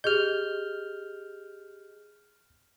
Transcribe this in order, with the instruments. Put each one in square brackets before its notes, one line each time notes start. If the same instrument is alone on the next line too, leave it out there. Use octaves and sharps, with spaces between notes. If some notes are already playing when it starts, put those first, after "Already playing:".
[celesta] G4 G#4 D#5 [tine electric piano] F6 G6